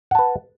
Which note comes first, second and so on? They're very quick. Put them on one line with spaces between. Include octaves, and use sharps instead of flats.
F#5 A5 B4